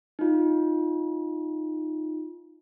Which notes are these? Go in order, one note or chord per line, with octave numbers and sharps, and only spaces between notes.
D#4 F4